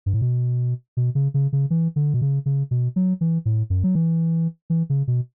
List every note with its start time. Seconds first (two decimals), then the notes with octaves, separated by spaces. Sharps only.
0.06 G2
0.14 A2
0.22 B2
0.97 B2
1.15 C#3
1.34 C#3
1.53 C#3
1.70 E3
1.96 D3
2.14 B2
2.22 C#3
2.46 C#3
2.71 B2
2.96 F#3
3.21 E3
3.45 A2
3.70 F#2
3.84 F#3
3.95 E3
4.70 E3
4.90 C#3
5.08 B2